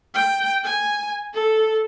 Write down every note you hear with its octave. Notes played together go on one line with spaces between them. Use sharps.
G5
G#5
A4